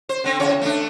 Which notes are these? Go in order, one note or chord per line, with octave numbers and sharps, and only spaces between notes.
C5
D3 C4
E2 C#3 C#5
A3 D4